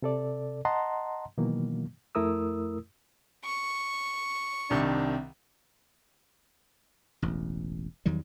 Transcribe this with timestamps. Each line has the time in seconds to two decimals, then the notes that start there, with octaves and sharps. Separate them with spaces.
0.02 C3 A4 D5
0.65 D#5 F#5 A5 A#5 C6
1.38 B2 D#3 E3 F#3 A#3
2.15 F2 A3 E4 A#4 D#6 E6
3.45 C#6
4.70 C2 C3 D#3 D4
7.22 E1 A1
8.06 E2 D#3 F#3 G3